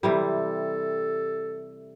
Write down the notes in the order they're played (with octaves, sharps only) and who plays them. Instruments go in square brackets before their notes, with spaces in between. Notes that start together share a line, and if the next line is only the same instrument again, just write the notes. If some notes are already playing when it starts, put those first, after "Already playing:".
[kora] C3 E3 G3 [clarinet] A4